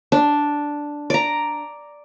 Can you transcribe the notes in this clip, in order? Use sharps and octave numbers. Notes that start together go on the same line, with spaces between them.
D4
D5 A#5